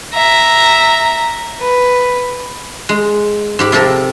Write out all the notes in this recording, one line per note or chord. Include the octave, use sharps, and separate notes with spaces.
E5 A#5
B4
G#3
G#2 G4 B5
C3 F3 G4 A4 A#4